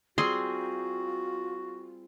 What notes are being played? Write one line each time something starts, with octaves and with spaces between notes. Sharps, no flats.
G3 C4 F4 F#4 G#4 C6